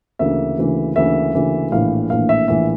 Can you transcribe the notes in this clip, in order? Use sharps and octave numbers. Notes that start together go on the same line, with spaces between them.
D2 C#3 E3 A#3 E5
D2 C#3 E3 A#3
D2 C#3 E3 A#3 E5
D2 C#3 E3 A#3
A#1 A2 E3 A#3 F5
A#1 A2 E3 A#3 F5
E5
A#1 A2 E3 A#3 E5